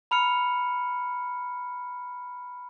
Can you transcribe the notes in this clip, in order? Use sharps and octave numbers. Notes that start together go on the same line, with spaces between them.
A#5 B5 F6 C#7